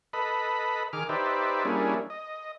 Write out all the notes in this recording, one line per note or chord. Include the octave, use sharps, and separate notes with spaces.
A4 B4 D#5 B5
D#3 G#4 D6 F6
D#4 G4 B4 C5 D5 E5
G3 A#3 C#4 D4 E4 G#4
D#5